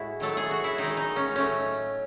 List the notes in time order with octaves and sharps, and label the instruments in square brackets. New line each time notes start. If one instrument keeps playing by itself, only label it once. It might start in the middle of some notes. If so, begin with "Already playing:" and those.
Already playing: [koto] A2 G#3 E4 F#4
D#3 F#3 A3 A4
G#4
F#4
E4
D#3 G#3 D#4
D#4
C#4
A2 F#3 A3 C#4